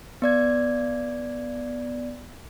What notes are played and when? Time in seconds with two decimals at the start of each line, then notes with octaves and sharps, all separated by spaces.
0.22 B3 D5 G#6